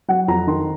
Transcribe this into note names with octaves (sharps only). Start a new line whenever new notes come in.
F#3 F#5
F2 A#5
D#3 C6